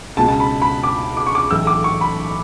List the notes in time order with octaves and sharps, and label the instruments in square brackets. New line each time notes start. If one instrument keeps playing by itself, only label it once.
[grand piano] C#2 B2 A5
A5
B5
B5
D6
D6
C#6
D6
B1 A2 E3 E6
D6
C#6
B5